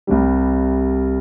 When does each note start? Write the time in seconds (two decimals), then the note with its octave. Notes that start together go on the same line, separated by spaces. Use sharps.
0.07 C2 C3 G3